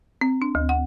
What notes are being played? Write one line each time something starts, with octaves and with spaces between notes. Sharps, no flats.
C4
D4
D2
F#5